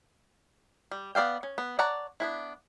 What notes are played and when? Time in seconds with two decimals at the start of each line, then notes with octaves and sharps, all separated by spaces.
0.91 G3
1.15 B3 D5 F5 G5
1.43 C#4
1.58 B3
1.79 C#5 D5 F#5 A5 A#5
2.20 B3 D4 E4